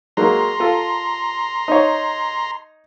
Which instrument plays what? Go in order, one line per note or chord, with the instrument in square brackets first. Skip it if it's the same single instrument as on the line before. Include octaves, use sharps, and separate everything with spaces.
[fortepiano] F#3 G#3 A#3 [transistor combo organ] A#5 C6
[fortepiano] F4 A4
D#4 C#5